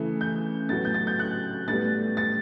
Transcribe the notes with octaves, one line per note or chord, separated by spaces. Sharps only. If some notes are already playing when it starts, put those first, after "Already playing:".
Already playing: C#3 E3 A3
G6
A2 F#3 B3 A6
G6
A6
G6
F#6
A2 G3 B3 A6
A6